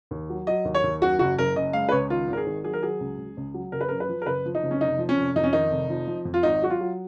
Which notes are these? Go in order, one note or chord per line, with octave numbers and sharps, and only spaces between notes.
D#2
F#3
F#3 D#5
D#2
C#5
D#2
F#2 F#4
F#1 F#4
F#1 A#4
C#3 D#5
G#3 F5
B4
C#2 C#5
D#3 F4
G#1
A#4
G#4
D#3
F#3 G#4
A#4
F#3 G#4
C#2
C#2
C#2
F#3
F#1 A#4
B4
F#2 A#4
B4
F3
A#4
F#1 B4
F3
D#4
F#1
C#4
F1 D#4
F3
C#4
F1
F2 D#4
C#4
D#3 D#4
F1
F3
F3
F2
F4
G#1 D#4
F#3 F#4
F4
F#3